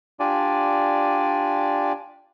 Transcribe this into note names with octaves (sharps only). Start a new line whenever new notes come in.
D4 F4 G4 D5 G#5